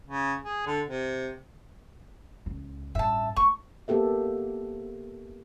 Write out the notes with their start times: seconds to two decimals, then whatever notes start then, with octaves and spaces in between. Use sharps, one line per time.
0.07 C#3
0.44 G#4
0.66 D3
0.87 C3
2.46 C#2
2.95 A1 G2 E5 A5
3.37 A3 C#6
3.88 A#3 B3 G4 A4 E5